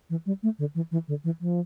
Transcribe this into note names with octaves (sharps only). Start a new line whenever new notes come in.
E3
G3
A3
D3
E3
E3
D3
E3
F3